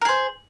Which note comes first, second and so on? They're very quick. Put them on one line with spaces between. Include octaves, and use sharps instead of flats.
A#4 G#4 C5